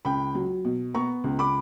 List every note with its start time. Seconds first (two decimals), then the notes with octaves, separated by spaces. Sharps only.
0.05 C#2 G5 B5
0.35 F#3
0.65 B2
0.94 B3 A#5 C#6
1.24 C#2
1.39 B5 D6